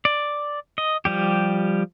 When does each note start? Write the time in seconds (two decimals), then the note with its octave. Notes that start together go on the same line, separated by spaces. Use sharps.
0.05 D5
0.78 D#5
1.05 F3 G3 G4